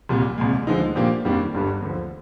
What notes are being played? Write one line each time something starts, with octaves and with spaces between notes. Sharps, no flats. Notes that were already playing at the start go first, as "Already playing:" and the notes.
C2 A#2 G3
C2 A#2 G#3
D2 D3 F3 G#3 D#4
A#2 F3 A#3 D4 G4
F2 D#3 G3 A#3 D4
G1 G2 D3 G3
D2 D3 F3